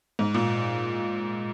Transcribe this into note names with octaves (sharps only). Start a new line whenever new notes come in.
G#2
A#2